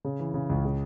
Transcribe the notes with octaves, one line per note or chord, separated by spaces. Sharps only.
C#3
E3
C#3
C#2
C#3